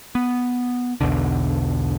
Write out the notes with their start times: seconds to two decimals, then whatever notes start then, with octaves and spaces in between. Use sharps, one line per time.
0.15 B3
1.01 B1 E2 B2 D3